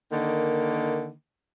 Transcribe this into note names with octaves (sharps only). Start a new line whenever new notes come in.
D3 D#3 A#3